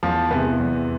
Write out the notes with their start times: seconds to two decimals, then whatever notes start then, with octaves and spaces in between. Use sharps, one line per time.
0.03 E2 F3
0.31 C3 E3 G#3 B3
0.60 E2